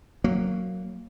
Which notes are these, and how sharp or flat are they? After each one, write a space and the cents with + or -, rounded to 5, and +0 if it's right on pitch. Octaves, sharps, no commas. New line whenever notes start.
F#3 +0 A#3 -15